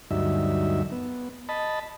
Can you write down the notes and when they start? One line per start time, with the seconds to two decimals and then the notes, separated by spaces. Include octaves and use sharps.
0.11 D2 G2 F#3 D#4 E5
0.92 B3
1.49 D#5 A5 B5